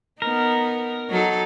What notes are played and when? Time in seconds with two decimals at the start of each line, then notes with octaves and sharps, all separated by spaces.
0.22 B3 D#4 A#4
1.10 F#3 D#4 A4